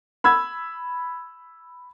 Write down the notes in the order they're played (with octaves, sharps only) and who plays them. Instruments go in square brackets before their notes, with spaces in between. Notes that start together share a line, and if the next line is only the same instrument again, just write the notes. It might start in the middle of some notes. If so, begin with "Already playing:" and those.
[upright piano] B5 E6 G#6